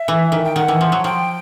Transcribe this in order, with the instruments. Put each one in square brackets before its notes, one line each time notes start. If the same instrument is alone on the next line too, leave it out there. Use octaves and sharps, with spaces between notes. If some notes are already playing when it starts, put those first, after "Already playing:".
Already playing: [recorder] E5
[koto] E3
D#3
[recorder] G5
[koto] D#3 [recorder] F#5
[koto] E3
F3
F#3
[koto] F3 [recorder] G5